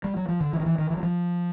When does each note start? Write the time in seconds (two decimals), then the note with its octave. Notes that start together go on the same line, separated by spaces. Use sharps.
0.04 G3
0.17 F#3
0.28 F3
0.41 D3
0.53 E3
0.60 D#3
0.66 E3
0.78 D#3
0.90 E3
0.97 F#3
1.03 F3